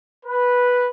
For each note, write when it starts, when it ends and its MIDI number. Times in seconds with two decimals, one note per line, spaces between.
0.25 0.89 71